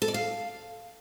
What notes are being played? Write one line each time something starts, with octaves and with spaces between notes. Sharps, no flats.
A4
D5
F5